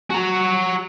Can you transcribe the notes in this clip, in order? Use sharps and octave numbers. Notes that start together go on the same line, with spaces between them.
F#4 A#5